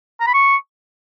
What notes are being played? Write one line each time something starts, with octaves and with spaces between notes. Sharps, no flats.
A#5
B5
C#6